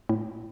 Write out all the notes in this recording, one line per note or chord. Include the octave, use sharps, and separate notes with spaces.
A2